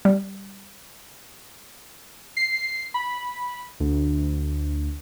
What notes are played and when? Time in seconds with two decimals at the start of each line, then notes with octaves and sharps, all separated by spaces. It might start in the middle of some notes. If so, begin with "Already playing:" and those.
0.05 G3
2.37 C7
2.94 B5
3.80 D2